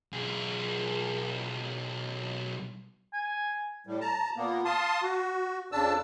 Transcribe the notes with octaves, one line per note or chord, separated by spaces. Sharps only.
B1 G#4
G#5
A2 G3
A5 A#5
A#2 A#3 B3
F5 A5 C6 D#6
F#4
F2 C#3 D4 A5 E6